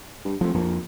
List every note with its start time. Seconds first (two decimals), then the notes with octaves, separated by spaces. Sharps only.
0.25 G2
0.41 F2 F3 A3
0.54 A#1 F2 F3 A#3